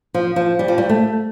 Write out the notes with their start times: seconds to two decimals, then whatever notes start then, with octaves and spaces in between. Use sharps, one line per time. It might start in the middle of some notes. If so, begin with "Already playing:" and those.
0.14 F3
0.36 F3
0.59 G3
0.68 F3
0.78 G3
0.89 A3